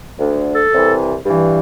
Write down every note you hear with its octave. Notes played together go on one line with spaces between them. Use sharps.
D2 D3
A4
C2 C3 E3
G2 E3